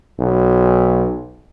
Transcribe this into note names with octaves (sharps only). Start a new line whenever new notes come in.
B1